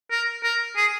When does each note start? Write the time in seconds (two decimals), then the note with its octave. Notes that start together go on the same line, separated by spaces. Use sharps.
0.11 A#4
0.44 A#4
0.77 G#4